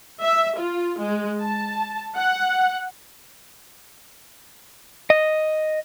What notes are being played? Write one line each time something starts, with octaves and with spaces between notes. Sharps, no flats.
E5
F4
G#3
A5
F#5
D#5